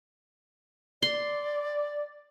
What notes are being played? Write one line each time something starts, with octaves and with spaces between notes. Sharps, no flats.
D5 C6